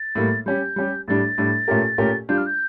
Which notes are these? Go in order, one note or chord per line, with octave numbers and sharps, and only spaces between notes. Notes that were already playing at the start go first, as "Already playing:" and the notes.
Already playing: A6
A2 G3 A#3
G3 C#4 G4 G6
G3 C#4 G4
A2 G3 D4 A6
A2 G3 D4
A#2 A3 C#4 G4 A#4
A#2 A3 C#4 G4 A#4
G3 D4 F4 G6
F6
G6